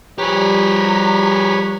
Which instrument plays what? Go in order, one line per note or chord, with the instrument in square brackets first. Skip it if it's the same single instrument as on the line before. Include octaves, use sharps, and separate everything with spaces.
[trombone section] F3 G3 [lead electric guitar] G4 G#4 [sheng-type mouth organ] B4 C#5 [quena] A#5